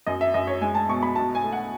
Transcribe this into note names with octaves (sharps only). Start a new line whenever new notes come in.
F#2 D#5
E5
F#2 D#5
C#5
G#3 G#5
A5
B2 C#6
B5
B1 A5
G#5
A3
F#5